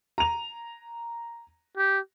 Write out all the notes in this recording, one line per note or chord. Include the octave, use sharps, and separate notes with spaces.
A#5 F7
G4